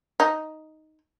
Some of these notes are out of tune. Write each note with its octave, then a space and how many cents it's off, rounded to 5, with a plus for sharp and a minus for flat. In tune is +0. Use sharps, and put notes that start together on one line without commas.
D#4 +5